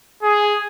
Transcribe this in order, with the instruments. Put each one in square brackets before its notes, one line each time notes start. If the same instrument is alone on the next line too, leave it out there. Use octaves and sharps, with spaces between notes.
[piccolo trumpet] G#4